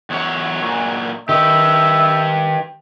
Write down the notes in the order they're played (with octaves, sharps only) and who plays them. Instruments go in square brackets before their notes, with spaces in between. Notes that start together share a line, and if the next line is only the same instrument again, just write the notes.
[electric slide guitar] E2 F#3 C#5
A#2 F#3
[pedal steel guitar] D#3 D#6 [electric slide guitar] G4 B4 [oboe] E5